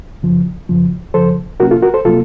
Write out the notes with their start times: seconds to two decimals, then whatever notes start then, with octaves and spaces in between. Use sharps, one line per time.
0.23 F#2 C#3 F3
0.69 F#2 C#3 F3
1.14 F#2 C#3 F3 A4 C5
1.60 C3 F#3 A#3 C#4 F#4 A#4
1.71 F4 A4
1.83 F#4 A#4
1.94 A4 C5
2.05 C3 F#3 A#3 F4 A4